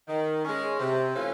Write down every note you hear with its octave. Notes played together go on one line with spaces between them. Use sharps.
D#3
G#3 C#4
C3
E3 A3 C#4 F4